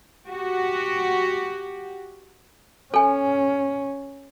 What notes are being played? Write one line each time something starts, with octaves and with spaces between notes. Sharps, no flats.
F#4 G4
C#4 A4 G#5